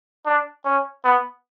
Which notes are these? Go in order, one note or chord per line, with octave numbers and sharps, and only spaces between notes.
D4
C#4
B3